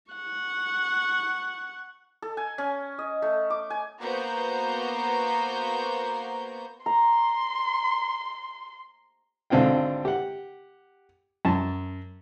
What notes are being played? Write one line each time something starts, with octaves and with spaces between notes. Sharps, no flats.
F#5 C#6
A4
G#5
C#4
D#5
A3
D6
G#5
A#3 B3 F#4 C5 A#5 G6
A#5 C6
G#1 D3 C4 F4 G5
G4 F#5
F#2 A5